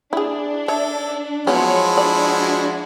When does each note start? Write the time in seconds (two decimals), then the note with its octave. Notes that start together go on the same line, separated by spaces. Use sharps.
0.13 D4 E4 G#4
0.68 A4 C#5 E5
1.47 F3 F#3 G#3 B3 C#4 E4 C#5 F#5
1.97 D4 F#4 D5